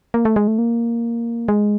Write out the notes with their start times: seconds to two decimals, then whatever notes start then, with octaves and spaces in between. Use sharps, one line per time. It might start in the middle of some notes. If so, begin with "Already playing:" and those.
0.14 A#3
0.25 A3
0.36 G#3
0.48 A3
0.58 A#3
1.48 G#3